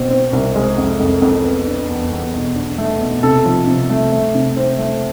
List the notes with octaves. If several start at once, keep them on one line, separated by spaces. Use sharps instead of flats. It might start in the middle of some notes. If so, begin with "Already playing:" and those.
Already playing: B2 C4
C4
C2
G#3
F2
F2
F2
B3
D4
E2
E2
B2
D4
A3
B2
C3 A4
F3
C3
A3
A3
C3
C4
A3